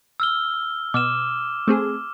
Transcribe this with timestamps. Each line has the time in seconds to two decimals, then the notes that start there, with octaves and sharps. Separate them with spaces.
0.20 E6 F6 G7
0.94 B2 D6 F6 E7
1.67 A3 C4 G#4